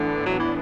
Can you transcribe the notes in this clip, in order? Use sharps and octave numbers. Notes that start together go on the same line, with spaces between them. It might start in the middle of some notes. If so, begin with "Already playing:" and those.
Already playing: A2 D3 E3 B3 D4
F#3
E3